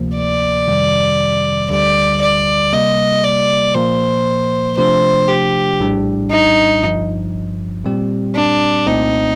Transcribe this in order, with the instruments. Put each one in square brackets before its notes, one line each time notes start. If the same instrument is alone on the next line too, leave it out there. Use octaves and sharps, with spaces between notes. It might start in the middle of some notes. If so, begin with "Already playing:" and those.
Already playing: [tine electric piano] D2 C3 F3 A#3
[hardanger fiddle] D5
[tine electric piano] F2 C3 D#3 G3
[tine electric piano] D2 D3 G3 [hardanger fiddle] D5
[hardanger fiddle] D5
[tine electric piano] C3 G3 A#3 [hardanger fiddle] D#5
[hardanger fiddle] D5
[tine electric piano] A#2 F3 A#3 [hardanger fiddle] C5
[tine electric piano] C3 F3 A3 D4 [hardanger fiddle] C5
[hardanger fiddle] G4
[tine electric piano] A#1 A2 G3 D4
[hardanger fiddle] D#4
[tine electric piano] G1 G2 F3
A#2 G3 C4 G4
[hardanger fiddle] D4
[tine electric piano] C2 A#2 A3 C4 [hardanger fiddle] D#4